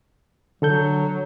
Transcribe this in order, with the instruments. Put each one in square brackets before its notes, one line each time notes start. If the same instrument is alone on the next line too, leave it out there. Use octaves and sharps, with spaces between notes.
[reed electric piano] D3 A4 G6 [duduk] F#3